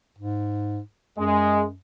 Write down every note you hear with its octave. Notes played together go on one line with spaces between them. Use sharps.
G#2
F#2 G#3